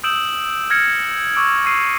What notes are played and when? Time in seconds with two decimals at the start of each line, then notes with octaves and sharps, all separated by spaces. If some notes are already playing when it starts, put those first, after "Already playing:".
0.04 D#6 E6 G6 D7 E7 F#7
0.70 F6 G#6 A#6 C#7
1.35 C#6 D6 E6 D7
1.64 C#6 E6 G#6 C7 D#7